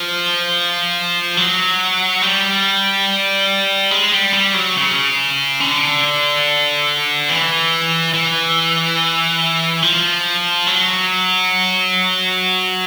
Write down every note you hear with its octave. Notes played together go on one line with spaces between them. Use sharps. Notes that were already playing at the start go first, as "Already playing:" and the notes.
Already playing: F3
F#3
G3
G#3
G3
G3
F#3
C#3
D3
E3
E3
F3
F#3